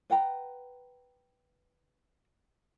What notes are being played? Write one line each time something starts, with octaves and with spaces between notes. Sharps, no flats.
B4 F#5 G5 A#5